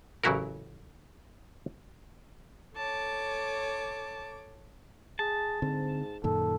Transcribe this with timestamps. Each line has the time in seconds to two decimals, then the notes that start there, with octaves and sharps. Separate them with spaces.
0.24 A1 C#3 F#3 E4 F#4 A#4
2.77 A4 C#5 A5 D6
5.19 G#4 A5
5.62 G#2 D3 C4
6.24 F#2 A#2 D#3 A4